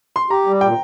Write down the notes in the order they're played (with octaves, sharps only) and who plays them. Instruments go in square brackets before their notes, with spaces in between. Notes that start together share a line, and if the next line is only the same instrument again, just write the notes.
[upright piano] C6
[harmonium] G4 [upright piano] A#5
[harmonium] G3
[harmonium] A#2 [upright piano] G5